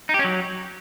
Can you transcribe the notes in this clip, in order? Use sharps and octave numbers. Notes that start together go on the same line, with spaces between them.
D#4
G4
C#4
F#3